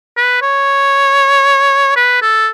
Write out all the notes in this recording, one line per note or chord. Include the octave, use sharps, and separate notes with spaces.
B4
C#5
B4
A4